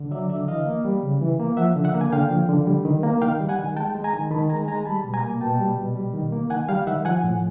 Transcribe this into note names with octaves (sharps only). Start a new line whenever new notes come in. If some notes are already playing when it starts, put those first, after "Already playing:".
Already playing: D3
F#3 D5 E5
D3 D5 E5
E3 D#5 F5
A#3
G3
C#3
E3
A#3
F3 E5 F#5
D3
E5 F#5
A#3
G#5
D3 F5 G5
F3
D3
G3
D#3
A#3
D#3 F5 G5
G3
F#5 G#5
D#3
G#3 G5 A5
G#3
G#5 A#5
D#3
D#3 A5 B5
G#3 G#5 A#5
G#3 G#5 A#5
G3 A5 B5
B2
G#5 A#5
A#3
B2 G5 A5
G3
B2
G3
D#3
A#3
D#3 F#5 G#5
G3 F5 G5
D#3 E5 F#5
F3 F#5 G#5
A2